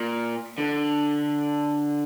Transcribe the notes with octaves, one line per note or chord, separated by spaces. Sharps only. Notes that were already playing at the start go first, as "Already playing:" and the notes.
Already playing: A#2
D3